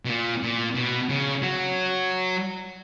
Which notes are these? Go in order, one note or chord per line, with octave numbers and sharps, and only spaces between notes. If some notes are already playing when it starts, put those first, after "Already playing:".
B2
A#2
A#2
B2
C#3
F#3